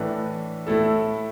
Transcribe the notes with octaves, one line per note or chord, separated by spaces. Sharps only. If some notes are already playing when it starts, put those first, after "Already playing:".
Already playing: A2 E3 D4 B4
A2 A3 E4 A4